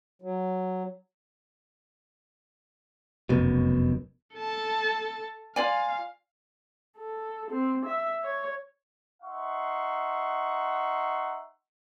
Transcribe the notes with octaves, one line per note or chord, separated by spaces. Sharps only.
F#3
F1 B1 F#2 B2
A4 A5
F4 D5 F5 G#5
A4
C4
E5
C#5
D#4 E5 F#5 C6 C#6